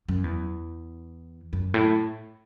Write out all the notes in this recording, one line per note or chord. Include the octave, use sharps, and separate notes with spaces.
F#2
E2
F#2
A2